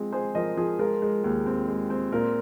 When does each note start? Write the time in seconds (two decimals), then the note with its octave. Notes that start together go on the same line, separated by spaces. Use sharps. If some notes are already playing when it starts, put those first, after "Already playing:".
Already playing: F3 G#3 C4
0.13 G#3 G#4 C5
0.35 F3 A#4 D#5
0.57 F3 G#4
0.79 G#3 F4 A#4
1.02 G#3
1.24 D#2
1.46 C4
1.68 G#3
1.90 C4
2.12 A#2 F4 A#4